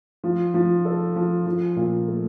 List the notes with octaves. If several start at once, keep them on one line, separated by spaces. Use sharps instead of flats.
F3
F3
A4
F3
F3
A#2
A3